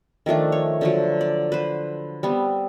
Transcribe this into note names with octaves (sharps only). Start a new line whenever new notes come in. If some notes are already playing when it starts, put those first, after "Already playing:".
D#3 F3 A3 D4
C#5
D3 F3 F#3
D5
B4 C5
G3 B3 C4